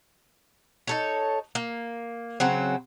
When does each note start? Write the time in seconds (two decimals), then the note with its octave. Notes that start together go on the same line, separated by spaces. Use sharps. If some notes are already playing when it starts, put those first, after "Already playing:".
0.87 D#4 A4 C#5
1.55 A#3
2.40 C#3 F#3 C4